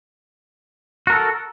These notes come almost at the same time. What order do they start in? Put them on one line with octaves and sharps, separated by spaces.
F#4 A#4 A4